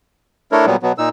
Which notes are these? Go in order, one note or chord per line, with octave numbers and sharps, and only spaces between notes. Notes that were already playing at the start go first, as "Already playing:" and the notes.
A3 D4 E4 A4 A#4 C#5
A#2 F#3 G3 B3
B2 F#3 B3
A#2 D#4 E6